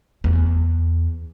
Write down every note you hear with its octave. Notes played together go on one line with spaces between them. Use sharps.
E2